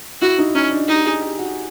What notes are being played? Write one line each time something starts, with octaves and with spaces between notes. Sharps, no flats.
E4 F#4
D#4
C#4 D#4
D4
D#4 G4
G#4
G4
F#4